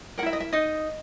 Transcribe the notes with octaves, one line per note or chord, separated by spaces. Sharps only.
E4 A#4 E5 F#5
D#5
E5
D#4 D#5